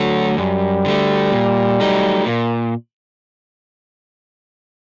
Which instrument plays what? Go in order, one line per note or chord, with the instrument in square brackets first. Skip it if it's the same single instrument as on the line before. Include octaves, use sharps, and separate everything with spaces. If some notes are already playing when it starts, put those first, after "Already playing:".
Already playing: [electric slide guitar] D3 A3 [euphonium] F#3
[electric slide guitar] F#2 [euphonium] G3
[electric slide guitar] D3 A3
A#2
F#3 A3 D#4
[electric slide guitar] A#2 [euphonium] A#3